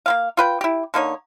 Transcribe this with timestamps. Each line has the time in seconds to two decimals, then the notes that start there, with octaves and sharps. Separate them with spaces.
0.06 A#3 B3 F5
0.37 F4 B4 G5
0.61 E4 G4
0.94 D3 A#3 D#4 C#5